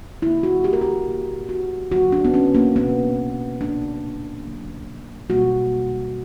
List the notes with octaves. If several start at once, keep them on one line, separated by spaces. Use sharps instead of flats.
D3 A#3 E4
F#4
G4
A#4
G4
A#2 A#3
F#4
D3 F#3 A#3 F#4
D4
B3
C#4
A#3
B2 A#3 B3
A#2 A#3 D4
D3 F#3 A#3
B2 G3 A#3 F#4